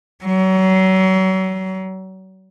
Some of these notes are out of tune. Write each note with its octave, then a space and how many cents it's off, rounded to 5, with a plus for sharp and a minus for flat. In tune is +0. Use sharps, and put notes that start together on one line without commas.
F#3 +35